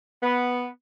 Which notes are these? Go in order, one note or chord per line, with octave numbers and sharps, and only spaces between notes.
B3